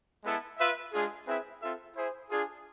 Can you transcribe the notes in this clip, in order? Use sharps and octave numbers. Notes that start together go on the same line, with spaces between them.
G#3 B3 E4 A4
F4 B4 E5
G#3 D4 F4 G#4
C4 E4 G#4 B4 E5
C4 F4 A4 E5
E4 G#4 C5
D4 F4 G#4